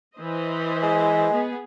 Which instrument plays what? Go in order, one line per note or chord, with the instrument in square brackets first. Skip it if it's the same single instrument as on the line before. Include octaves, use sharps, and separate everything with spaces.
[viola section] E3 C5 D#5
[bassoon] G#3
[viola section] B3 G#4